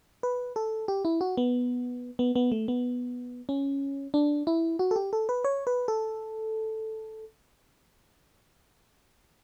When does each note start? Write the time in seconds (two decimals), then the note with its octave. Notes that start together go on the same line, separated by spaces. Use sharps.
0.23 B4
0.56 A4
0.88 G4
1.05 E4
1.21 F#4
1.37 B3
2.19 B3
2.36 B3
2.52 A3
2.68 B3
3.49 C#4
4.14 D4
4.47 E4
4.79 F#4
4.91 A4
4.96 G4
5.13 A4
5.29 B4
5.44 C#5
5.67 B4
5.88 A4